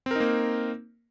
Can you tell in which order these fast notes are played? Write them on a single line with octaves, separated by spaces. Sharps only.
C4 A#4 D#4 A#3